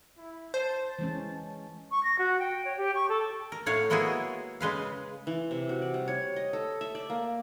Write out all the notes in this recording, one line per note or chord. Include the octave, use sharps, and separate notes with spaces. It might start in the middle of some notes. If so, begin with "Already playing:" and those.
E4
C5 A5
E3 G#3 C#4
C#6
A#6
F#4
G5
C#5
G4
C#6
A4
A#4
A2 C#5 F5 F#5
G#3 A#3 B3 E4 F#4 G#4
C#3 G#3 B4 F5
E3
C3
F#4
D5
G3
C#5
D#5
A4
E5
D5
A#3